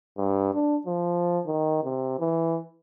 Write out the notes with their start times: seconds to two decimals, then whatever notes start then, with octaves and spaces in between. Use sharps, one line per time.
0.18 G2
0.54 D4
0.86 F3
1.45 D#3
1.84 C3
2.20 E3